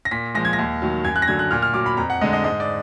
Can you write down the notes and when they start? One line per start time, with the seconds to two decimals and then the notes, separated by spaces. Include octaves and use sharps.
0.05 A#6
0.11 A#2 B6
0.35 F3 G#3 A#6
0.45 G#6
0.53 A#6
0.59 D#2
0.82 D#3 F#3
1.05 F#2 G#6
1.16 F#6
1.22 A#6
1.28 D3 F#3 G#6
1.39 F#6
1.51 A#2 F6
1.62 F6
1.74 F#3 D6
1.86 B5
1.97 F2 A#5
2.10 F#5
2.21 D3 G#3 D#5
2.33 D#5
2.44 G#2 D#5
2.60 D5